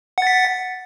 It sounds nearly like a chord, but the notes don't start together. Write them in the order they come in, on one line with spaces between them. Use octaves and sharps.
F#5 A6 B6